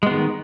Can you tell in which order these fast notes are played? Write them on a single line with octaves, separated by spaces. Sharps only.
G#3 B3 D#3